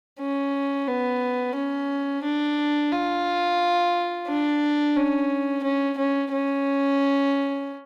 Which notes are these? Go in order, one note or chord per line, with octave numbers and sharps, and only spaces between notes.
C#4
B3
C#4
D4
F4
D4
C#4
C#4
C#4
C#4